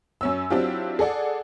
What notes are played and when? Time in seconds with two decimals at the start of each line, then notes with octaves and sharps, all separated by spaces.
0.21 F#2 C#4 E6
0.50 F#3 C4 D4 E4 F4 G4
0.99 G#4 A4 D5 F#5